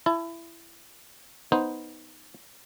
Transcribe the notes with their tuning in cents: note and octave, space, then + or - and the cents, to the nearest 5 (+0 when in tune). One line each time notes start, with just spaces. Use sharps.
E4 +20 A5 +0
B3 +0 D#4 +5 C5 +0